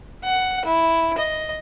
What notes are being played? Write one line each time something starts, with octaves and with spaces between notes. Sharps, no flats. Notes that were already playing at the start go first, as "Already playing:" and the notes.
F#5
E4
D#5